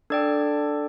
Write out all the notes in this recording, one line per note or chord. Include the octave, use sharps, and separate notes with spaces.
D4 A4 D5 G5